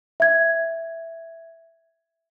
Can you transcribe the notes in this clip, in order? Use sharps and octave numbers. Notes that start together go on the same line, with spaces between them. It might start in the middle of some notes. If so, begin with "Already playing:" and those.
E5 G#6